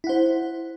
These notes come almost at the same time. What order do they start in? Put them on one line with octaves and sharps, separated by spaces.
E4 F#5 C5